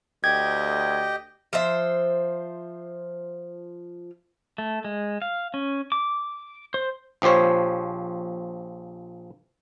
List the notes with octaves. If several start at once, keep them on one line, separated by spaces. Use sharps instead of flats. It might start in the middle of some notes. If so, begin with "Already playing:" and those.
D2 G4 D#5 G5 G#6
F3 C5 E5
A3
G#3
F5
C#4
D6
C5
A#1 F3 G4 C5 C#5